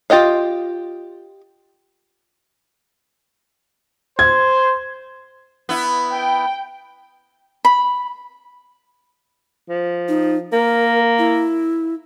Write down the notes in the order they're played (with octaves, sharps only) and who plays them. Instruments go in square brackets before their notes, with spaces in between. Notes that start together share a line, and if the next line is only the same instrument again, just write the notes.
[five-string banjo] F4 G4 D#5 F5
[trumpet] C5 [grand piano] G#6
[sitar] B3 E4
[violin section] G5
[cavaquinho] B5
[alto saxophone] F3
[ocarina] D#4
[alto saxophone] A#3 [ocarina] A#4
[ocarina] E4